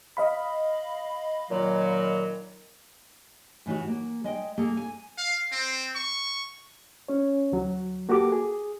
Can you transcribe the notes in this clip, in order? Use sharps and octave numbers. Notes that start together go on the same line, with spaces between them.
D#5 F5 B5
A#2 D#3 F#3
A2 E3 D#4 F#4
A#3
G#3 D#5 G5
A#3 G#4 A4
G#5
F5
C4
C#6
C#4 C#5
D2 F#3
A#3 F#4 G4 A4 D6
G#4